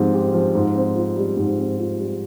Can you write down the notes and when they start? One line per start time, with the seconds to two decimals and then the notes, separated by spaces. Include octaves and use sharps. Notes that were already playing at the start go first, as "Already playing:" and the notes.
Already playing: G#2 F3 C4 G4
0.13 G4
0.33 F3
0.55 G#2
0.75 C4
0.95 F4
1.16 G3
1.37 G#2
1.58 C4
1.78 F4
1.99 G3